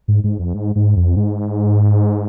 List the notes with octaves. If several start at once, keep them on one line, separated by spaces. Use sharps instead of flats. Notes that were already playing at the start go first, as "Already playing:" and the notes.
G#2
G#2
F2
G#2
G#2
F2
G#2